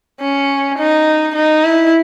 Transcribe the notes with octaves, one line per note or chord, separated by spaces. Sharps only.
C#4
D#4
D#4
E4